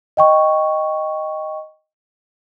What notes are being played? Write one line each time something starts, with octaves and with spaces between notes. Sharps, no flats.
D#5 G5 C#6